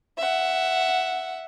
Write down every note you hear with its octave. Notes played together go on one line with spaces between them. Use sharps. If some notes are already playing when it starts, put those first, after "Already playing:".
E5 F#5